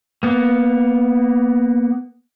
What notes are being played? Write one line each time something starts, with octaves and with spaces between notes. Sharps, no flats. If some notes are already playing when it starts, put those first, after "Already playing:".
A#3 B3